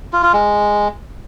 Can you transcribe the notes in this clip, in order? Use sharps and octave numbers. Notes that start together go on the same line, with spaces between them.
F4
F4
G#3